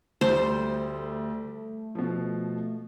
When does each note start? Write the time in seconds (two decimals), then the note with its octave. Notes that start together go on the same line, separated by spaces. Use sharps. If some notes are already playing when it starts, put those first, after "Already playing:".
0.21 D2 G3 A3 C5
1.95 B2 F3